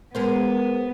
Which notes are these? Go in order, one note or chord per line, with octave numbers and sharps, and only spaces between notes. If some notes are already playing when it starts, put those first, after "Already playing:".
G#3 B3 A#4 C5